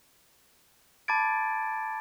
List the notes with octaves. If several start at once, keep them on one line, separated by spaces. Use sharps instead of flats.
A5 B5 D6 G#6 A6 D7